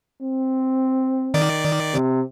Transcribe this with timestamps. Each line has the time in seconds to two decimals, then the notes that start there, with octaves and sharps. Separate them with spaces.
0.22 C4
1.34 D#3 D5
1.94 C3